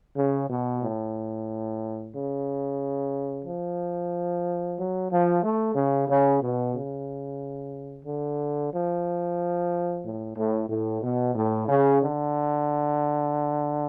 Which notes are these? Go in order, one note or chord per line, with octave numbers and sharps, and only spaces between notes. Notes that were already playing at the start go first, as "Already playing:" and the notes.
C#3
B2
A2
C#3
F3
F#3
F3
A3
C#3
C#3
B2
C#3
D3
F3
A2
A2
A2
B2
A2
C#3
D3